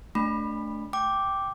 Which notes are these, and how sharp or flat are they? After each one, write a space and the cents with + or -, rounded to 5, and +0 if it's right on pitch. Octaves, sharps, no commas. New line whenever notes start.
A3 -5 D4 -15 B5 +0
G5 +0 D6 +0